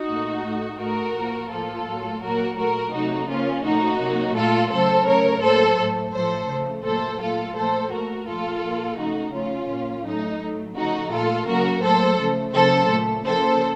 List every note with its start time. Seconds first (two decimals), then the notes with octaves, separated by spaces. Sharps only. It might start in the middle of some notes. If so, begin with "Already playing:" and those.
Already playing: D#4 F#4
0.08 A#2 A3
0.44 A2 A3
0.79 A2 A3 F#4 A#4
1.15 A#2 F3 A#3
1.51 A2 F3 A#3 F4 A4
1.86 A2 F#3 A#3
2.21 A#2 F#3 A#3 F#4 A#4
2.57 A#2 F#3 A3 F#4 A#4
2.93 C3 F#3 A3 D#4 F#4
3.29 C#3 F3 A#3 C#4 F4
3.64 A#2 F3 A3 D#4 F#4
4.00 C3 F#3 A#3
4.35 A#2 A3 F4 A4
4.71 C#3 F#3 A3 A4 C5
5.06 C#3 A3 A#4 C#5
5.42 A2 F#3 A#3 A4 C5
5.78 A2 A3
6.13 A2 F3 A3 A4 C5
6.48 C#3 A3
6.84 A#2 F#3 A3 A4 C5
7.20 A#2 A3 F4 A4
7.55 A#2 F3 A3 A4 C5
7.91 A#2 A3 F#4 A#4
8.26 A#2 F3 A3 F4 A4
8.62 A#2 F3 A#3
8.98 C#3 F3 A3 D#4 F#4
9.33 C#3 F3 A3 C#4 F4
9.69 A#2 F3 A#3
10.04 A2 F#3 A3 D#4
10.40 A2 F#3 A3
10.76 C#3 F3 A3 D#4 F#4
11.11 A#2 A3 F4 A4
11.47 C#3 F#3 A#3 F#4 A#4
11.82 A2 F#3 A#3 A4 C5
12.18 C#3 F3 A3
12.53 C#3 F#3 A#3 A4 C5
12.89 A#2 A3
13.25 C#3 F3 A#3 A4 C5